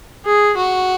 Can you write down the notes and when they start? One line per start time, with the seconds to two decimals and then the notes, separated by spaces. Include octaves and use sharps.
0.25 G#4
0.57 F#4